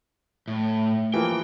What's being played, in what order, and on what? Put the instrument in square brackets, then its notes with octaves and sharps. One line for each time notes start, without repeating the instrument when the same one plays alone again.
[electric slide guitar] A2
[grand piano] E3 F3 A#3 [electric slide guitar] G5